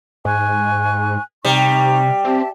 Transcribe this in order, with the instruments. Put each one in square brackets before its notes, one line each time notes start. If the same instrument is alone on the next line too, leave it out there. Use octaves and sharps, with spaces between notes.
[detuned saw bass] G#2 [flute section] G#5 C#6 F#6
[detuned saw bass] C3 [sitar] G3 [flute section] D#4 A#5 C#6
[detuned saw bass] C4 [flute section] G4 E5 A5